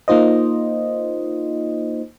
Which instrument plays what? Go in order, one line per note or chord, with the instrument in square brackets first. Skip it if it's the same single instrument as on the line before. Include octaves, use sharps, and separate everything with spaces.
[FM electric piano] A#3 D#4 F4 C5 D#5